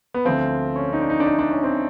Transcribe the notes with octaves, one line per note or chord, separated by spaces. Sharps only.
B3
D2 D3 F3 C4
C#4
D#4
D4
D#4
D4
D#4
D4
C#4
C4